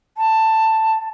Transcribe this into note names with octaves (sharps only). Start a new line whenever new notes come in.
A5